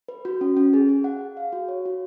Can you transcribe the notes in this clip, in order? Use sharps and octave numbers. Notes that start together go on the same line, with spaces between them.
B4
F#4
C#4
C#4
G#4
G#4
F#5
G#4
F5
F#4
C#5
F#4